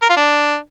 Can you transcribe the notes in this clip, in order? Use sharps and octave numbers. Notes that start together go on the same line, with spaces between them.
A#4
F4
D4